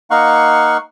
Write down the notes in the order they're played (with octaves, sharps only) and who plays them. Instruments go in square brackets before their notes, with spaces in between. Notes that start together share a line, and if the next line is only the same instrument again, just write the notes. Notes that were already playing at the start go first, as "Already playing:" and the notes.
[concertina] A#3 D#4 F5 F#5 C#6